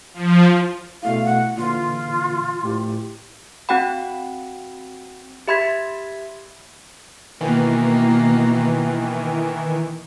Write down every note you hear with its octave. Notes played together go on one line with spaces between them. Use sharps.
F3
B2 A3 E4 F5
F#5
A#2 D3 E3 F4
A2 G4
C4 F#4 F#5 G5 B5
G4 E5 B5 C6 G#6 B6
B2 D#3 E3 A#3